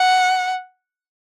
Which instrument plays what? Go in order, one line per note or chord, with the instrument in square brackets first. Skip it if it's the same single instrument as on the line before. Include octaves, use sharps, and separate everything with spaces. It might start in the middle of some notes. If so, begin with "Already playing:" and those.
Already playing: [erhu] F#5